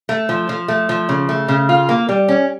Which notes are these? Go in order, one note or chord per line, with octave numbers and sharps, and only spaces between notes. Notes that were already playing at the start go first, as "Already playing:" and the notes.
A3
F3
F3
A3
F3
C#3
A3
C#3
F4
A#3
G3
C#4